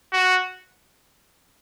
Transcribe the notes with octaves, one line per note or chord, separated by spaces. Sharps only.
F#4